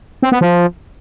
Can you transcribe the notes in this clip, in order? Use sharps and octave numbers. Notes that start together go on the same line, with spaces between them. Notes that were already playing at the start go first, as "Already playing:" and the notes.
C4
B3
F3